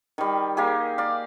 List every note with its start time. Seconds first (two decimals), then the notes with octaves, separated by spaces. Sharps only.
0.18 D#3 G3
0.57 A#3 G4 G#4
0.98 D5 F5